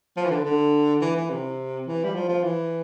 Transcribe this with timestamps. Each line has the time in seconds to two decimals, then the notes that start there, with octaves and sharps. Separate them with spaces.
0.17 F3
0.25 E3
0.30 D3
0.45 D3
1.02 E3
1.16 E3
1.30 C3
1.87 E3
2.04 G3
2.15 F3
2.29 F3
2.43 E3